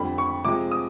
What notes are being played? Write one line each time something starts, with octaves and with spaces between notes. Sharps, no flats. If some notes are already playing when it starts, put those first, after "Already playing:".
Already playing: F2 D3 G3 B5
C#6
C3 F3 G#3 D6
D#6